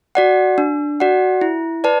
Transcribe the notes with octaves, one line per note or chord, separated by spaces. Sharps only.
F#4 D5 F#5
D4
F#4 D5 F#5
E4
B4 D5 A5